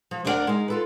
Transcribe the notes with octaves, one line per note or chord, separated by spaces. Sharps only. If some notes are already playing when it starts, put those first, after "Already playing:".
F3
D2 D4 E4 A#4 D5 F#5
G#3 D#4
F4 A4 B4